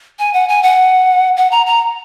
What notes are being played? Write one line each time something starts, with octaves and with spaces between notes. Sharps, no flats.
G#5
F#5
G#5
F#5
F#5
A#5
A#5